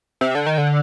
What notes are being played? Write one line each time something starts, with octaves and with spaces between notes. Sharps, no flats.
C3
D3
D#3
D3